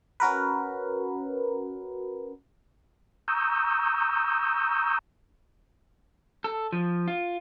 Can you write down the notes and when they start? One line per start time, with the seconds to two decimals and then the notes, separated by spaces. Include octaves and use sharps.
0.20 C#4 F#4 A#4 B4
3.28 A#5 C#6 D#6 E6 G6
6.44 A4
6.72 F3
7.08 F4